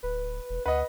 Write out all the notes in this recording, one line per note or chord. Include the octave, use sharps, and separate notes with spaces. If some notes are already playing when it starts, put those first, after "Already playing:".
D1 B4
E1
D2 B4 D#5 F#5